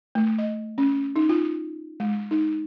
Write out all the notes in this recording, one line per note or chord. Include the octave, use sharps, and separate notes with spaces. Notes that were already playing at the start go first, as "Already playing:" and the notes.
A3
D#5
C#4
D#4
F4
G#3
D#4